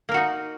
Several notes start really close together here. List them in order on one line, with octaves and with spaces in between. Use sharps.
A#3 A#4 F#4 D#4